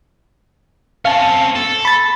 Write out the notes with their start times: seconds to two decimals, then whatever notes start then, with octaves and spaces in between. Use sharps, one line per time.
1.05 C4 C#4 F5 A5
1.55 A4
1.85 B5 A6